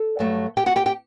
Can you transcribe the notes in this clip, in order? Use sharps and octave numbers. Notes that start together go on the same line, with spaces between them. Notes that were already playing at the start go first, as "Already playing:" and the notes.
Already playing: A4
G2 F#3 A3
G4 G5
F#4 F#5
G4 G5
G4 G5